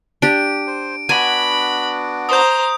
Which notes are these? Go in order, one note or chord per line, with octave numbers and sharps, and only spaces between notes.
D4 G4 D7
C5
B3 D4 F#4 G#5 B5
C5 A#5 D#6 G6